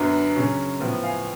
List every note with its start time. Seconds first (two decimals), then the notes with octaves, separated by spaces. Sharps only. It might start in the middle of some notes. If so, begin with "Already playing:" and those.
Already playing: F#2 D3 F#3 B3 D4
0.35 C#3 F#3 C#4
0.80 A2 F3 B3
1.03 F5 G#5